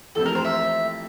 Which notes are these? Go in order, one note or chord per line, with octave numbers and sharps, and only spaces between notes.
F2 E3 A3 C4 G4 A4
A#4
C5
E5